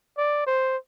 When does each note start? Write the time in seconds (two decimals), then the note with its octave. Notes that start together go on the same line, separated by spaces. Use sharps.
0.18 D5
0.46 C5